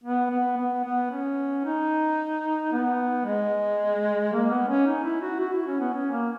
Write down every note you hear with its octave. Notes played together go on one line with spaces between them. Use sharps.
B3
B3
B3
B3
C#4
D#4
B3
G#3
A#3
B3
C#4
D#4
E4
F#4
F#4
E4
C#4
B3
C#4
A#3